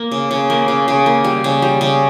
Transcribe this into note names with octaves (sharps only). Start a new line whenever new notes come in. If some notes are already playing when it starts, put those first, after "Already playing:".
Already playing: A#3
C#3
C#3
A#3
C#3
C#3
A#3
G3
C#3
G3
C#3